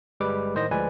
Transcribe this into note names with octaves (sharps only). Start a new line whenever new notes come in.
G1 G3 G#3 B4 D6
A2 D#3 C5 D#5 A#6
D2 F3 G#3 B4 D5 G#5